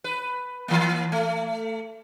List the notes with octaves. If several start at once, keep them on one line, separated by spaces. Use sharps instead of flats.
B4
E3 A#3
A3